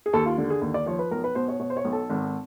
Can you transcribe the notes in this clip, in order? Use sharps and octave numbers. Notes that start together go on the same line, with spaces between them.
G#4
D#2 A4
F4
D3
G#4
D#2
D5
F3 C#5
B4
B1 A#4
B4
B2 C5
C#5
B2 C#5
C5
C#5
B1
A4
G#1